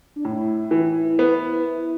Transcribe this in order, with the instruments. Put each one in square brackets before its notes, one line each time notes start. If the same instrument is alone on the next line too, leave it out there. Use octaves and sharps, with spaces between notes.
[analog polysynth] D4
[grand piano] A2 [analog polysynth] E4
[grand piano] E3
B3